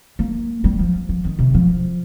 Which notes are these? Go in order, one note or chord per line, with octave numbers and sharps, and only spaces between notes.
A#3
G3
F3
F3
D#3
C3
F3